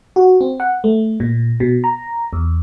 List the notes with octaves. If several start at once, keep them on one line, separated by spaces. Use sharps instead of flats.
F#4
C4
F#5
A3
A#2
B2
A#5
E2